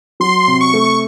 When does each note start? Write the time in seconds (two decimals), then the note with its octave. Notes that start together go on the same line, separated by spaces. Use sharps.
0.20 F#3 C6
0.48 C3
0.61 C#6
0.74 A3